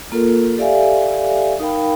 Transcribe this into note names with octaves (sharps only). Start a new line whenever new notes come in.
A#3 F4 A4 A#4
G4 A4 D5 E5 F5 G#5
D#4 A#4 F5 G5 B5